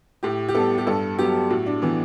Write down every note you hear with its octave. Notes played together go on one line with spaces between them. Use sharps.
A2 G4
G4
G3 B3 A4
G4
G2 A4
F#3 B3 G4
A2 F#4
D4
E3 B3